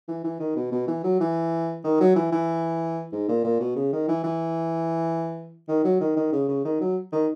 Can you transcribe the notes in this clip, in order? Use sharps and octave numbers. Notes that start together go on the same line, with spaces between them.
E3
E3
D#3
B2
B2
E3
F#3
E3
D#3
F#3
E3
E3
G#2
A#2
A#2
B2
C#3
D#3
E3
E3
D#3
F#3
D#3
D#3
C#3
C#3
D#3
F#3
D#3